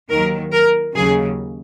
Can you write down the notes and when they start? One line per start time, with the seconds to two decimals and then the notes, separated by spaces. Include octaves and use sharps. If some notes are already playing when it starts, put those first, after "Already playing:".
0.10 D#2 D#3 F#3 A#4
0.52 A#4
0.95 D#2 C#3 F#3 G#4